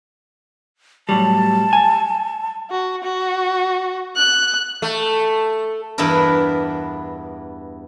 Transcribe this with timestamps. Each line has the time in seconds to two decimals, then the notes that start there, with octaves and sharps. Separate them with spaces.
1.09 A2 F#3 G3 A5
1.73 G#5
2.71 F#4
3.04 F#4
4.16 F#6
4.82 A3
5.98 E2 G2 B3 D4 E4 A#4